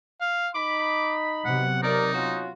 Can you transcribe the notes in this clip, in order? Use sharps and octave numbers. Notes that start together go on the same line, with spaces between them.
F5
D#4 B5 D6
C3 F#3 B3 F#5
D#4 A#4 D5
C#4 F4 F#4